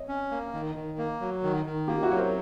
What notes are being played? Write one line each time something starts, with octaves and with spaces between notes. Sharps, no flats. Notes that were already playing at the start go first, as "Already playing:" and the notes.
Already playing: C#5 D#5 E5
C#4
A#3
D#3
D#3
A#3
F#3
D#3
D#3
A#3 F4 G4
E4 F#4
F#3 C#5
A#4 C5